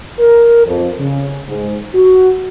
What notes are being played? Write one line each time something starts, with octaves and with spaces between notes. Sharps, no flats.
A#4
F2
C#3
G#2
F#4